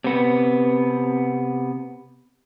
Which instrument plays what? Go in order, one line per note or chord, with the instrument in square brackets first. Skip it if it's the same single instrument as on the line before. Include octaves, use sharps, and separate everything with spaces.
[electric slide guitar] C3 B3